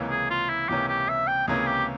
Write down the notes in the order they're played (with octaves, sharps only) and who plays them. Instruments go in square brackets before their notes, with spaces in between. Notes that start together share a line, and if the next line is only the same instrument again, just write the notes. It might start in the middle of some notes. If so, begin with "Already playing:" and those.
Already playing: [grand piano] C#2 C3 E3 A#3 C#4
[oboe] G#4
F4
E4
[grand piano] C#2 C3 E3 A#3 C#4 [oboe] G4
[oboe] G4
E5
G5
[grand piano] C#2 C3 E3 A#3 C#4 [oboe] G#4
[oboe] G4